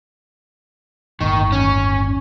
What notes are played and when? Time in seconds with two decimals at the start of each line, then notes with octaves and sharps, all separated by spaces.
1.21 G1 D#2 A2 D#3 C#6
1.52 C#4